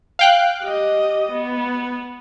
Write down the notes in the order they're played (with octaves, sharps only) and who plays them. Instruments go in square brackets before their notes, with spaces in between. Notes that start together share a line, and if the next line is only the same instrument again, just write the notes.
[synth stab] F5 G5 F#6
[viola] G4 D#5
B3